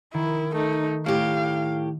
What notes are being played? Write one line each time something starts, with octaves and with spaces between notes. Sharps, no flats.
D#3 E4
A3 D#4
A2 G4 F5